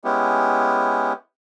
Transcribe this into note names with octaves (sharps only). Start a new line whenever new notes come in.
G#3 B3 C#4 E4 G4